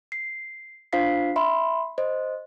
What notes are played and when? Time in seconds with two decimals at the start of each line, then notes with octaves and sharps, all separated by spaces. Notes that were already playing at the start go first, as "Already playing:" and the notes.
0.12 C7
0.93 D4 F4 C5 F5 B6 C7
1.36 E5 B5 C6
1.98 C5 D#5